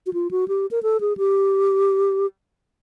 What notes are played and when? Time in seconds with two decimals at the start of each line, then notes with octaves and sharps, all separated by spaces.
0.06 F#4
0.13 F4
0.31 F#4
0.48 G4
0.71 A#4
0.83 A4
1.01 G#4
1.17 G4